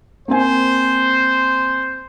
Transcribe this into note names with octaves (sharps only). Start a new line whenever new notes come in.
A#3 C4 C5 G#5